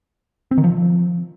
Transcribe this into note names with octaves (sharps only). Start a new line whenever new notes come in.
C4
D#3
F3